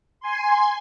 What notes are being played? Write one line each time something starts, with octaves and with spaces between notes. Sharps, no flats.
G#5 C6